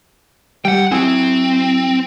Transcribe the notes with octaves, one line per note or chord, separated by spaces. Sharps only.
G3 F#5 G5
F#3 C4 E4 G#4